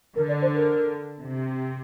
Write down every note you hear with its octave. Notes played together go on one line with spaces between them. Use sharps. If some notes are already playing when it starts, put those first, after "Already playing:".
D3 A#4
D5
C5
A#4
C3